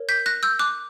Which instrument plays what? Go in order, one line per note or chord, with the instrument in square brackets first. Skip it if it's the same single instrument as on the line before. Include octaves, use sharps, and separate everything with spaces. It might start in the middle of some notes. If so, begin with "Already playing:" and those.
Already playing: [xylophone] A#4 C#5
G6 B6
F#6 A#6
E6 G6
D6 F#6